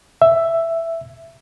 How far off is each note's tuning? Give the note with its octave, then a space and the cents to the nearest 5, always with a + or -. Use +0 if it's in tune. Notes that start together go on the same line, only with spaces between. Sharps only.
E5 +5